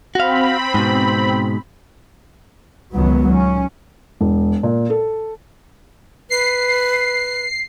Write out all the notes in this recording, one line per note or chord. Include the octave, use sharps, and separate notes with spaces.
C4 F#4 F5 B5
G#2 B2
C#2 D#3 F#3 B3
C#4
E1
A#2
A4
B4 C7